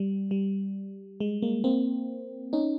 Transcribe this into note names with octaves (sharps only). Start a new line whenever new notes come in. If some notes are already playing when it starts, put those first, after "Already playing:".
Already playing: G3
G3
G#3
G#3 A#3
A#3 C4
C#4 D#4